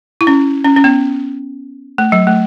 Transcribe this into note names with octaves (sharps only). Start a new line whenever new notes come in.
E4
C#4
C#4
C#4
B3
A3
F#3
A3